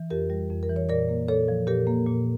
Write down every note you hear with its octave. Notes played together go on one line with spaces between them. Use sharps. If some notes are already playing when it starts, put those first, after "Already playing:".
Already playing: E3
F2 G4 A#4
G3
F2
A#4
E3
C#5
A#2 A#4 D5
A#3
A#2 A4 C#5
F3
A#2 G4 A#4
A#3
A#2